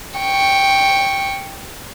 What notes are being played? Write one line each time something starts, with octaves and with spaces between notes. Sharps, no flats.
G5 C#6